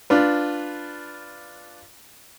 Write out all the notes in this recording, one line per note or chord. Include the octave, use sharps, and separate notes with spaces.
D4 F4 B4